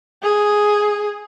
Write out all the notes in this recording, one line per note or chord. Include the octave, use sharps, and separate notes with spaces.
G#4